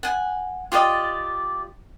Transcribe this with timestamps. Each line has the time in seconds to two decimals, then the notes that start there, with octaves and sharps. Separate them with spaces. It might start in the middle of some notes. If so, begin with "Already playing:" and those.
0.03 F#5 G#5
0.72 F4 G4 D5 D#5